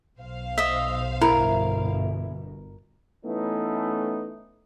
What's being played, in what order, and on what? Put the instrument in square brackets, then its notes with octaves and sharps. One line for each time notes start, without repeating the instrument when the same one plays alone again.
[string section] B1 C5 F5
[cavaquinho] D#5 E5
[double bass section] G1 B2 [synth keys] E4 [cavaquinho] A#4
[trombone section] E3 A3 B3 C#4 D#4 E4